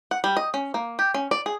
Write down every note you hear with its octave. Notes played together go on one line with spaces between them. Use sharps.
F#5
G3
D#5
C#4
A#3
G4
C#4
D5
G#4